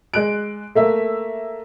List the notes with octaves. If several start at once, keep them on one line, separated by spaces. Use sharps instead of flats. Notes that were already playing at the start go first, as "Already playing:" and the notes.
G#3 F#6 D7
A3 A#3 E5